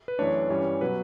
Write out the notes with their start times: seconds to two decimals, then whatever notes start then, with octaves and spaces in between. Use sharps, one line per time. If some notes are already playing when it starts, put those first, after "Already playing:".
0.08 B4
0.19 F#2 E3 A3 D4 C#5
0.50 G2 E3 G3 C#4
0.81 B2 F#3 B4